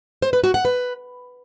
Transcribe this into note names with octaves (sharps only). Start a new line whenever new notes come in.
C5
B4
F#4
F#5
B4